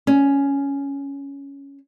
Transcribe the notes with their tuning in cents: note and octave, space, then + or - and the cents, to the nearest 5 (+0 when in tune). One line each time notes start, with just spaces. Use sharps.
C#4 +5